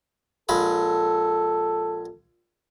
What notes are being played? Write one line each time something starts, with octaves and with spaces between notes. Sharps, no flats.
A#1 G#3 A4 B5